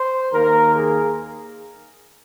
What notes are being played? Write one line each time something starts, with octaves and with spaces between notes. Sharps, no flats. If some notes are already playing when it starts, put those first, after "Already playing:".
Already playing: C5
D#2 D#3 A#3 A#4
G#4